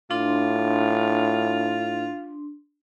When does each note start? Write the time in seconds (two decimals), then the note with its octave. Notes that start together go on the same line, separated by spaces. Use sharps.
0.11 A2 D4 F4 C6